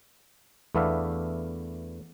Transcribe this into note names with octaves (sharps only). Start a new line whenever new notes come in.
E2 A3 B3 D4 E5 F5